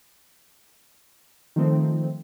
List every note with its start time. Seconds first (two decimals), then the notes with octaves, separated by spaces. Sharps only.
1.56 D#3 F3 A3 C4 D#4